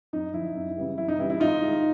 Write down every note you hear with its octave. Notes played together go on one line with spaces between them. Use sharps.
F#2 D#4
D3 F3 E4
F#2
C#3 E3 G3
F#2 E4
D#4
C#3 E3 G3 E4
E4
G#2 D#4 F4
G#3
D#3